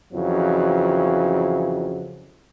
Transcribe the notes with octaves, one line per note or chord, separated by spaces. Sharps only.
F2 C#3 E3 F#3